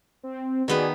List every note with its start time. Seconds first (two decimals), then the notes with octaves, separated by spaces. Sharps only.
0.23 C4
0.68 D#3 B3 F#4 G#4 B4 D5